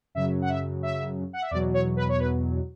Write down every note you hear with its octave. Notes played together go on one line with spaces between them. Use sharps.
F#2 C#3 F#3 E5
F#5
E5
E5
F#5
E5
E2 B2 F#3 D5
C#5
B4
C#5
B4